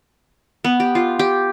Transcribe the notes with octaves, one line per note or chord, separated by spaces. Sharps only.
B3
G4
F4
G4